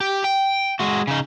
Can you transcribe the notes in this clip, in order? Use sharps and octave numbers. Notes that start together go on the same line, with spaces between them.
G4
G5
G#3 F#4
C#3 D#4